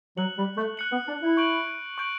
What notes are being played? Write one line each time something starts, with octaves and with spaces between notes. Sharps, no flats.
F#3 F#6 C#7 F#7
G3
A3
F#6 C#7 F#7
B3
D4
E4
C#6 G6 D7 F#7
C#6 G6 D7 F#7